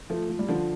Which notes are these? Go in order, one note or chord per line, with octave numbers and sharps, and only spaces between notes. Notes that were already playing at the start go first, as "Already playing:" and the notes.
F3 A3
F3
G3
D3 F3